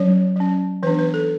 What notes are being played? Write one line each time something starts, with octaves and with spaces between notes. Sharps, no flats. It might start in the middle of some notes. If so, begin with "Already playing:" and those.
Already playing: F#3 C#4 C#5
F#3 C#4
E3 B3 D4 B4
B4
A4